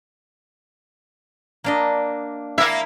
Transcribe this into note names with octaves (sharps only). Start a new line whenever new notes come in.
A#3 D4 D#5
A#3 E4 A#4 E5 G#5